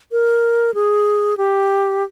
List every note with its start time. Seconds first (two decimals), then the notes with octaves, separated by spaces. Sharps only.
0.12 A#4
0.74 G#4
1.37 G4